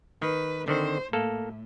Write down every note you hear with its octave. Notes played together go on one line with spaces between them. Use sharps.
D#3 B4
D3 D#3 C4 C5
A2 A#3 A4